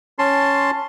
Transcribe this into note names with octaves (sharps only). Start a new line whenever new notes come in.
C#4 A5 C6